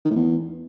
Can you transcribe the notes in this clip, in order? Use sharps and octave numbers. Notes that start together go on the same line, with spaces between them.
D#3
A2
E2